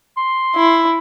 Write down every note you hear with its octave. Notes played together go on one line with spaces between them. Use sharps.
C6
E4